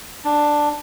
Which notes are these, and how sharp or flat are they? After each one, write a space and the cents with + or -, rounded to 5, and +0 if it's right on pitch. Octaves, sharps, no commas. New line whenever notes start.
D4 +5